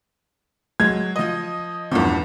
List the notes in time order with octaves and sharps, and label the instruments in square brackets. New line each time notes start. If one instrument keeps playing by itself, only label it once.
[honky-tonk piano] F#3 G#3 [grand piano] G#6
[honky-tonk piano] F3 D#5
[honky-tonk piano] B1 F3 [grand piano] E2 G2